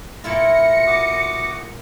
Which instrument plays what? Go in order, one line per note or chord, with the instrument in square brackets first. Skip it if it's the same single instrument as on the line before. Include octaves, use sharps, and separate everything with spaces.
[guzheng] A#2 E4 F4 [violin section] A#6 C#7
[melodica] F#4 D6 D#6